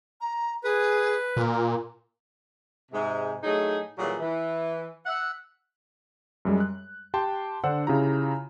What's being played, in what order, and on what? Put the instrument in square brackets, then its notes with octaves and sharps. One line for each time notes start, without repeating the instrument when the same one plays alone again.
[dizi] A#5
[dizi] G#4 [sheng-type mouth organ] B4
[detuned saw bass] A#2 [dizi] A#4
[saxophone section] G#2 C3 G#3
A2 F#3 A3 D#4 G#4
A#2 D#3 E3 F#3 G3 G#4
E3
E5 F#5
[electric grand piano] F#2 G3 G#3
F#6
G4 G5 A5 C6
D3 D4 C5 F#5 E6
C#3 E4 F4 G4 A#5